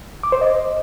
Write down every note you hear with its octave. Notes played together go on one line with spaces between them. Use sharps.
D6
C5
D#5